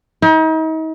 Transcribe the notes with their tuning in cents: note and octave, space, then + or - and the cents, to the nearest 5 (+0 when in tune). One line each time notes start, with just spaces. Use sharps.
D#4 +40